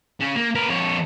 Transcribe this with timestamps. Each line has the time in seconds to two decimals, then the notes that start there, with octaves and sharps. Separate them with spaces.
0.20 C#3 C#4
0.36 A#3
0.55 B3 A#4
0.69 F2 C#5